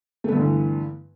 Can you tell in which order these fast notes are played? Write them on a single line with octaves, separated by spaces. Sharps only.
A3 B3 G2 D3 E3